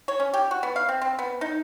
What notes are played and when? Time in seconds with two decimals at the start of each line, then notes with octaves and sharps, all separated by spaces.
0.08 C#5
0.20 C#4
0.34 G4
0.51 F#4
0.63 B3
0.76 F5
0.89 C4
1.02 C4
1.19 B3
1.41 D#4